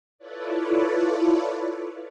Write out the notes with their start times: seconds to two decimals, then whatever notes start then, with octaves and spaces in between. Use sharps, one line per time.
0.18 E4 F4 A4 B4 C#5 D5